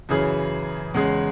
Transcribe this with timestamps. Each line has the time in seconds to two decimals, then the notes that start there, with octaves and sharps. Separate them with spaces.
0.09 F#2 C#3 E3 C#4 G#4
0.94 E2 C#3 G#3 C#4 G#4